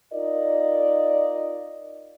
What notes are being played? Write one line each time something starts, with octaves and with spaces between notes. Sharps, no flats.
D#4 F4 A#4 D5 D#5